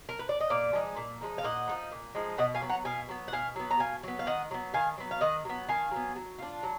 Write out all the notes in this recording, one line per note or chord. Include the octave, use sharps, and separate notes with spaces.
A#4
B4
D5
D#5
A#2 D5 F5
F3 G#3 D#4
A#2
F3 G#3 D#4
F5
A#2 D#5 F#5
F3 G#3 D#4
A#2
F3 G#3 D#4
B2 D#5 F#5
F5 G#5
F#3 B3
F#5 A#5
B2 F5 G#5
F#3 B3
F#5
B2 F5 G#5
F#3 B3
A#5
B2 F5 G#5
F#3 B3
F5
D#3 D#5 F#5
F#3 B3
D#3 F5 G#5
F#3 B3
F5
D#3 D#5 F#5
F#3 B3
D#3 F5 G#5
F#3 B3
F#3
D4 F4
F#3